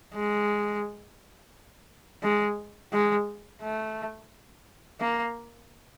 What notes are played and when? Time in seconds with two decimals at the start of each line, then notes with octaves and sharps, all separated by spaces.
0.15 G#3
2.23 G#3
2.92 G#3
3.62 A3
5.00 A#3